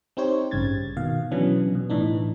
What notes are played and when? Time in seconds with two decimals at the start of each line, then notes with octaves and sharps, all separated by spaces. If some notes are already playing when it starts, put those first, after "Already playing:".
0.17 C4 D#4 G4 C5 C#5
0.51 A1 G2 C#3 G#6 A6
0.97 B2 D#3 F5
1.31 B2 E3 F#3 B3 C#4 D4
1.75 B2
1.90 A2 E3 D4 D#4